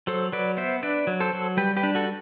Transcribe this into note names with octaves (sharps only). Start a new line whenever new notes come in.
F#3 A4 C5
F#3 B4 D5
B3 C5 E5
D4 B4 D5
F#3
A4 C5
F#3
G3 G4 B4
G4 B4
D4
F#4 A4